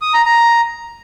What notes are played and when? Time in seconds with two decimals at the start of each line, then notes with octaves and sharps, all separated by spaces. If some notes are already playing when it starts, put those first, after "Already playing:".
0.02 D#6
0.14 A#5
0.26 A#5